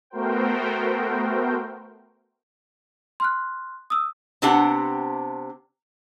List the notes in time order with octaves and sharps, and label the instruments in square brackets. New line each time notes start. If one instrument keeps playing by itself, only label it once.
[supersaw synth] A3 B3 F#4 A#4 C5 G5
[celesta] C6 F6 F#6
D#6 E6
[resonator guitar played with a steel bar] C3 B3 C4 D4 G4 F#5